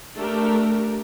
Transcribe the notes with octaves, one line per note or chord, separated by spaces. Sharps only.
A3 D4 G4 A#4